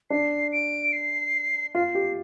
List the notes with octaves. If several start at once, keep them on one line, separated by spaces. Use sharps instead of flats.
D4 C7
D7
C7
F4 C7
G4